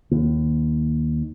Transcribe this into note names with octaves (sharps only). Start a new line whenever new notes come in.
D#2